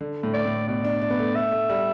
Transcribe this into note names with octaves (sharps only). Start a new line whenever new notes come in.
D3
A2
D5
A2
B2 D5
D4
D4
B3
A3
A3 E5
A3
G3